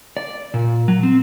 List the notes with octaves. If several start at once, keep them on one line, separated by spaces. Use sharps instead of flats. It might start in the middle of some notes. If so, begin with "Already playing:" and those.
D5
A#2
F#3
C4